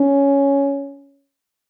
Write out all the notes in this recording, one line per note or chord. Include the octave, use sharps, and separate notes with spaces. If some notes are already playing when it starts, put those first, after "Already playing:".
Already playing: C#4